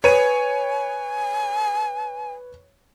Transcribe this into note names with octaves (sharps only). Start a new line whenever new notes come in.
B4 C#5 G#5 D#7